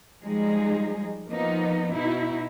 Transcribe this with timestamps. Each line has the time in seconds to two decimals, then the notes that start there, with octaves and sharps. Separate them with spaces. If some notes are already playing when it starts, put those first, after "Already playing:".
0.24 F3 G3 G#3 D#4 G#4
1.28 F3 A#3 B3 D#4
1.94 B2 D#4 E4